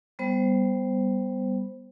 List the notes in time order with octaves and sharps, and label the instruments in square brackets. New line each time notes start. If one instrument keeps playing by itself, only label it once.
[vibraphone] G3 B3 C5